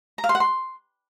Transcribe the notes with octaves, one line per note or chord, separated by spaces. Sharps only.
A#5
F5
C6
F#5
C6